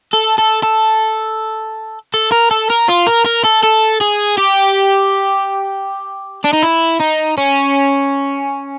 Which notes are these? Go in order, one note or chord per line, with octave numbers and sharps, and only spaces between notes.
A4
A4
A4
A4
A#4
A4
A#4
F4
A#4
A#4
A4
A4
G#4
G4
D4
D#4
E4
D#4
C#4